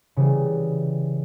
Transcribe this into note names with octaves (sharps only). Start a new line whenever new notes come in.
C#3 E3 G3